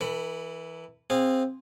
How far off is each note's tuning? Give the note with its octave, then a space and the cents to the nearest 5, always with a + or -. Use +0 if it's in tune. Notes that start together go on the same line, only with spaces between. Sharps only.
E3 -10 A4 +45 B5 +10
C4 +0 G#4 -20 F5 +0